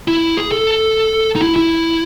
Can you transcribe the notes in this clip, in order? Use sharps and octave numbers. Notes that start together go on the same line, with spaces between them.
E4
G#4
A4
D#4
E4
E4